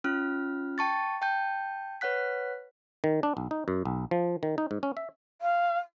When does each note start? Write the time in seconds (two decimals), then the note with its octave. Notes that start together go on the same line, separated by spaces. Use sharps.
0.04 C#4 F4 F6
0.78 G5 A5 C#6 A6
1.22 G5 A5 G6
2.01 B4 C#5 F#5 F#6 B6
3.04 D#3
3.23 D4
3.37 B1
3.51 D#4
3.68 F#2
3.85 B1
4.11 F3
4.43 D#3
4.58 D#4
4.71 G#2
4.83 C#4
4.97 E5
5.41 F5